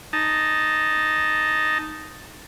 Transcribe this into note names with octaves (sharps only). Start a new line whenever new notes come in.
D#4 A5